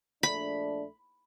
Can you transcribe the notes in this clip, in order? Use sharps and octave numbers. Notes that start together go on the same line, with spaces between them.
A#1 A3 D4 B5